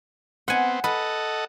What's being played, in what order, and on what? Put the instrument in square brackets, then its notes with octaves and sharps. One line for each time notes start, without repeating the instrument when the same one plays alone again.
[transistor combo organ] B3 C4 [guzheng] F#5 G#5
[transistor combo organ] A4 D#5 F#5 [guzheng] B4